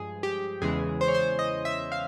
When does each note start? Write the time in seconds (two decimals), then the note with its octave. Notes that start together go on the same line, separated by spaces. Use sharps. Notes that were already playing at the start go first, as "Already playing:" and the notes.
Already playing: G2 F3 G#3 G#4
0.23 G4
0.62 E2 C#3 E3 G#3 G#4
1.01 C5
1.08 C#5
1.14 C5
1.39 D#5
1.65 E5
1.92 F5